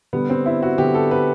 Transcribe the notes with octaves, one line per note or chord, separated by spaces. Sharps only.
D3 G3 B3
C4
E4
F#4
D3 G3 B3 G4
A4
B4